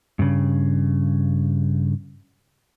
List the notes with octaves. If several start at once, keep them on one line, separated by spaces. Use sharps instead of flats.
G2 C#3